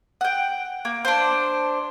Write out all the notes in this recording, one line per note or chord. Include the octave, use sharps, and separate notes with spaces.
F#5 G5
A#3
D4 C5